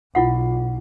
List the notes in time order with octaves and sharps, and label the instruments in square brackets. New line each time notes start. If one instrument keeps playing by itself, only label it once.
[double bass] B1 [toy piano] E4 F4 F#5